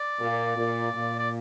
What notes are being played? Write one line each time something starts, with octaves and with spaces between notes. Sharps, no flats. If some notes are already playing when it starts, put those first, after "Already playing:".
Already playing: D5
A#2
A#2
A#2
D5